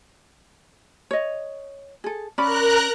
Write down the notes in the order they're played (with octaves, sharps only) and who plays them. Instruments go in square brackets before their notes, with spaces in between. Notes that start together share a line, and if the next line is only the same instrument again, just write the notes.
[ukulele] C#5 D#5
G#4 A4
[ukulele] C#4 D5 B5 [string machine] A#4 A#5 F#6